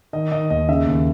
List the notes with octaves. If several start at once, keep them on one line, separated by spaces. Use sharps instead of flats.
D#3 D#5
D#3 D#5
D#2 D#5
C#3 E5
D#2